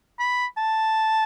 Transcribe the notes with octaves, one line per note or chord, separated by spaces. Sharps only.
B5
A5